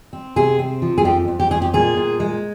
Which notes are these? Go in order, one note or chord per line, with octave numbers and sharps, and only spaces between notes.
C4
C3 G#4
C4
F3
G#4
F2 G4
F2
G4
F2 G#4
G4
A#2 G#4
A#2
G#3